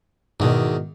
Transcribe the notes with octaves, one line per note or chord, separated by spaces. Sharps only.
E2 G#2 B2 D#3